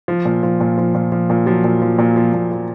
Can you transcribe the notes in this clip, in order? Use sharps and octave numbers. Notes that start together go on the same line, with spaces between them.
F3
A#2
F3
A#2
F3
A#2
F3
A#2
F3 F#3
A#2
F3
A#2
F3
A#2
F3